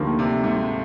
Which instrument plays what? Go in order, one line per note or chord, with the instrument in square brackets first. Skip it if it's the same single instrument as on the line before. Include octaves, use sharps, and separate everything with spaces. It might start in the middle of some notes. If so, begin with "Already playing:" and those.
Already playing: [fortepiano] D2 D3 G3 A#3 [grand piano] D#3 F3
[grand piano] C3
G#2